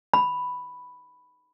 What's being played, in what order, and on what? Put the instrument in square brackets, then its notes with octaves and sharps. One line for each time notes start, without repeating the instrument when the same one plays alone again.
[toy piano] B5